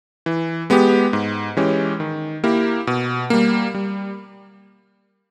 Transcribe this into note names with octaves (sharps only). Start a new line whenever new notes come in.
E3
G#3 B3 G4
G#2
E3 G#3 C#4 G4
D#3
A#3 E4 G4 A#4
B2
G3 A#3
G3